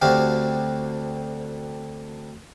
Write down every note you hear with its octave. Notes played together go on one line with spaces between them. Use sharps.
D2 D3 C4 F#4 G4 F5